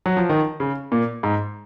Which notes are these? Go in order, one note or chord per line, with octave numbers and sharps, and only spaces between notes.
F#3
F3
D#3
C#3
A#2
G#2